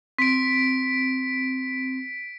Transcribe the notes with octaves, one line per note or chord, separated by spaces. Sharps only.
C4 B6 D7